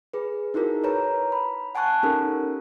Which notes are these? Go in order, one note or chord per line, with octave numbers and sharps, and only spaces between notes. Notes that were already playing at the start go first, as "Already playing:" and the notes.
G#4 B4
D#4 E4 F#4 G#4 A#4
B4 C#5 A#5
B5
F#5 G#5 A5 C#6 F#6
B3 C#4 D#4 G4 A4 A#4